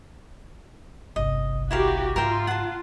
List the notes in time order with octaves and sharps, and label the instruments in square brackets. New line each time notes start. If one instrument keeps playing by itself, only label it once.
[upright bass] G1 C2 [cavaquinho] D#5
[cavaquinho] E4 A#4 F5 [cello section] F#4 G4
[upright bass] G#2 C#3 [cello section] F4 [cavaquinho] A#4 E5 G5
[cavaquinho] F#5 A5